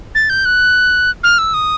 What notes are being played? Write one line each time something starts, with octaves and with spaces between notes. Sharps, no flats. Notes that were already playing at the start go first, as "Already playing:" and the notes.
A6
G6
F#6
F6
E6
D#6